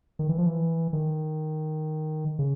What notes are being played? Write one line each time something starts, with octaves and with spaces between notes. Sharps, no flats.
D#3
E3
F3
E3
D#3
C#3